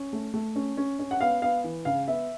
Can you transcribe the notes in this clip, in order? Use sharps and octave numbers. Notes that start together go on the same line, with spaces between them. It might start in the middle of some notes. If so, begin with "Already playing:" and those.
Already playing: C#4
A3
A3
C#4
C#4
C#4
F#5
B3 F5
B3 F5
E3
C#3 F5
B3 E5